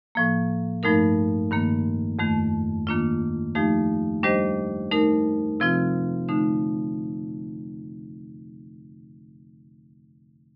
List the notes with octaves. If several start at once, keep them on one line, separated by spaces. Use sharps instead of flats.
A2 F3 A#3
G2 F3 A3 D#4 A#4
G2 D#3 A#3
F2 D#3 A3
D#3 A#3 D4 F4
F3 A3 D#4 G4
G3 D4 G4 C5 D#5
A3 D#4 A#4
C3 F3 C4 F4
D3 A3 D#4